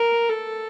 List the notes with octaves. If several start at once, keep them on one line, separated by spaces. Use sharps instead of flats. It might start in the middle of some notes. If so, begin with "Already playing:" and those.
Already playing: A#4
A4